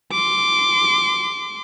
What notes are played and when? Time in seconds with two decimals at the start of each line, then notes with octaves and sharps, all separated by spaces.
0.12 C6 D6